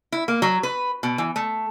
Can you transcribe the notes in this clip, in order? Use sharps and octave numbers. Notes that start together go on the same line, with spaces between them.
E4
A#3
F#3
B4
B2
E3
A3